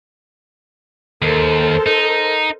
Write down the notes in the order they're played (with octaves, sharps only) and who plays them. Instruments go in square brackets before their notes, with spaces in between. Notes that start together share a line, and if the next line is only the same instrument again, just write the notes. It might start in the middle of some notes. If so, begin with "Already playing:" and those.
[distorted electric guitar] D#2 [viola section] A4 A#4 C5
[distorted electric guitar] D#4